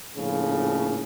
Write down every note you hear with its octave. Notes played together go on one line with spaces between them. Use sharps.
A#1 A2 C#3 F3